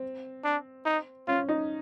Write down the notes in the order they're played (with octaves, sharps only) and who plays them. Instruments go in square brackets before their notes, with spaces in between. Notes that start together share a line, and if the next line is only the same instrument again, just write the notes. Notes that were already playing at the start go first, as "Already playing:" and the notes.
Already playing: [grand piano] C4
[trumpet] D4
D#4
[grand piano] C#4 [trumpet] F4
[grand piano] D#4